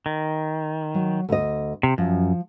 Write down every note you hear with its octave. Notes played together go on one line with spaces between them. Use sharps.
D#3
F#3
D2 D#5
C3
F#2 F3